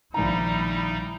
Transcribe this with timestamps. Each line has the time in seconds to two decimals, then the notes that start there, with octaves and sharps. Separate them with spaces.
0.14 A#1 D#3 G3 D#4 E4 A#5